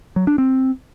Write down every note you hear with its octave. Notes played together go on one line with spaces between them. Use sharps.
F#3
D4
C4